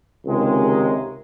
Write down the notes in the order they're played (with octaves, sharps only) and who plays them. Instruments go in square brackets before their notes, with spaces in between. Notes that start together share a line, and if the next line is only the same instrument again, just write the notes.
[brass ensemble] C#2 C3 D#3 G#3